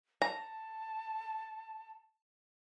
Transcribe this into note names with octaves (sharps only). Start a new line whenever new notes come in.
A5 A#5